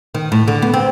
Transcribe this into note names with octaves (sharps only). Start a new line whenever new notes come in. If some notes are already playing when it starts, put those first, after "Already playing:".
D#3
A2
D3
B3
C4